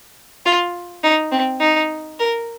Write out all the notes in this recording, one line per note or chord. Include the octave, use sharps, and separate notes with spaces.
F4
D#4
C4
D#4
A#4